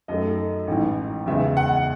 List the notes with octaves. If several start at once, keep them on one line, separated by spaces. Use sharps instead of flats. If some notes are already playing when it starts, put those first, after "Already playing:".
F#2 D#3 A3 D#5
A1 G#2 E3
E2 C#3 G#3 B3 E5
F#5